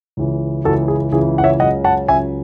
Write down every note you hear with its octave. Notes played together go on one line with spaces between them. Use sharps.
C#2 C#3 E3
C#2 C#3 E3 F#4 A4
G#4
C#2 C#3 E3 G#4
F#5
C#5 E5
C#2 C#3 F#3 D#5 F#5
F#5 A5
C#2 C#3 F#3 E5 G#5